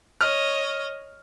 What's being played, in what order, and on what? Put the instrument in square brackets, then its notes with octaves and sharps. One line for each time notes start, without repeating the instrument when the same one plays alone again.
[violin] C#5 D#5 [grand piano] F6